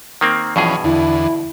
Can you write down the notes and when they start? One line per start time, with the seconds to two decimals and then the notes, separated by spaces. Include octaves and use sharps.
0.21 D#3 A#3 C4
0.56 G2 B2 E3 F3 C#4 G#4
0.84 E2 D3 E4